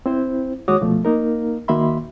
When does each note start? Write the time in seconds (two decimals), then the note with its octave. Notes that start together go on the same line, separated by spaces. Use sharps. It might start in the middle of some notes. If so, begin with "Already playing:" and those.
0.06 C4 E4 C5
0.68 D#2 G#3 F#4 C#5 D6 D#6
0.81 C2 B2 F3 A3
1.05 A#3 D#4 A#4
1.68 D#3 A#3 F#4 E5 B5 C6